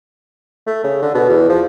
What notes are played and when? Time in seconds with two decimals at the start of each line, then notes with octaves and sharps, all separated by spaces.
0.67 A3
0.84 C#3
1.02 D3
1.15 B2
1.29 E2
1.49 F3